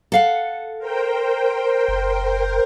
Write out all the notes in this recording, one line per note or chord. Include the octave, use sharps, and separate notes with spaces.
A4 F5 F#5
A#4 C5 G5
F#1